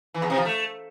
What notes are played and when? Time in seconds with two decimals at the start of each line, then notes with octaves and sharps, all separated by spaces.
0.14 E3
0.22 E2
0.30 C3
0.38 F3
0.45 A3